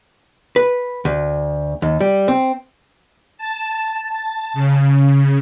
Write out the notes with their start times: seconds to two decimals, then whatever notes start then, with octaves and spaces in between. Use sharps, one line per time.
0.56 B4
1.05 D2
1.82 D#2
2.01 G3
2.28 C4
3.37 A5
4.54 C#3